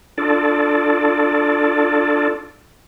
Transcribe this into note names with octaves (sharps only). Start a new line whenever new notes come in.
D4 F4 A4 D5